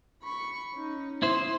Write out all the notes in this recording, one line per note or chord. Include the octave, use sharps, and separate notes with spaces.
B5 C#6
C#4 D#4
E4 C5 C6 D#6